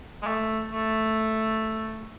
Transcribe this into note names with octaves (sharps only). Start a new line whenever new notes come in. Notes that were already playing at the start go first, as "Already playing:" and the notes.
G#3
A3
A3